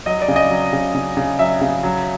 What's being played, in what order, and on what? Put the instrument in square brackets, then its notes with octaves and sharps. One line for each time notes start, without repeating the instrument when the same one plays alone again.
[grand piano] F#3 D#5
D5
C#3
D#5
F#3
C#3
C#3
C#3
F#3 E5
C#3
F#3